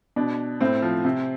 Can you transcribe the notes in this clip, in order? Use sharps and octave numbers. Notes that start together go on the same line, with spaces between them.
B2 D4
A2 C4
F3
C3